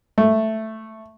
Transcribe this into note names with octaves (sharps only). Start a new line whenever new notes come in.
A3